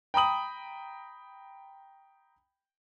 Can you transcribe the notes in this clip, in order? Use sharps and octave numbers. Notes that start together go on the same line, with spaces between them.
G5 A#5 B5 D#6 F#7